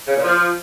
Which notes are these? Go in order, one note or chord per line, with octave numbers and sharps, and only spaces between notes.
C#3
A#2
F3